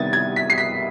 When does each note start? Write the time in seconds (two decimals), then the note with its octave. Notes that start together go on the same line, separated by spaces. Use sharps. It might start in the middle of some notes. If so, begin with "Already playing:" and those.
Already playing: C3 D#3 G3 B3 G#6 A6
0.13 G#6
0.36 B6
0.50 C7
0.58 B6